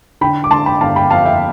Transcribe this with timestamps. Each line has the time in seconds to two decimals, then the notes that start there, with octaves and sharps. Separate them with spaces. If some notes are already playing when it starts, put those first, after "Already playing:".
0.21 D3 G5 B5
0.44 D6
0.51 D3 A5 C6
0.66 G5 B5
0.81 G1 F5 A5
0.96 G5 B5
1.10 F2 F5 A5
1.26 E5 G5